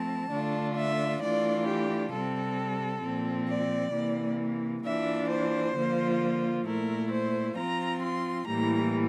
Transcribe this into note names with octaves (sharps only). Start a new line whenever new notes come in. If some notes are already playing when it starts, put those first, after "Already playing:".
Already playing: F3 A3 C4 A5
D3 A3 D4 F4
E5
E3 A3 D4 F4 D5
G4
C3 G3 C4 A4
A#2 F3 C4
D5
C3 E3 A#3
E3 A#3 D4 F4 E5
C5
D3 F3 A#3 F4
A#2 A3 E4 A#4
C5
F3 C4 F4 A#5
C6
A2 E3 G3 A#3 A#5